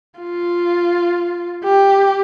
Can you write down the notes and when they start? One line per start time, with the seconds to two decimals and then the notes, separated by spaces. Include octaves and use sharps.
0.20 F4
1.64 G4